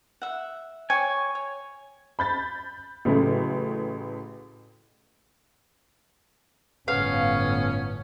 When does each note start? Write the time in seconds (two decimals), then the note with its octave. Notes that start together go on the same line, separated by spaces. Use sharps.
0.22 E5 F#5
0.90 C#5 G5 G#5 D6
1.35 C#5
2.19 B5 G6 A6
3.05 A1 C#3 F#3 A3
6.88 G1 A2 B3 C#4 F5